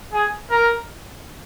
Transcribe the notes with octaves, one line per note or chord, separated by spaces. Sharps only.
G#4
A#4